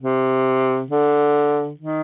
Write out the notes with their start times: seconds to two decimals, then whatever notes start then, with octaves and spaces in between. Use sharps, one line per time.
0.02 C3
0.90 D3
1.80 D#3